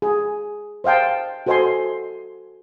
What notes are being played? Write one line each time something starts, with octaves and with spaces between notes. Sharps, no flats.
G#4
C5 D#5 F5 G5 A5
F#4 A4 C5 D#5 G#5 C6